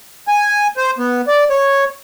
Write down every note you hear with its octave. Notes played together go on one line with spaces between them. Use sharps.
G#5
C5
B3
D5
C#5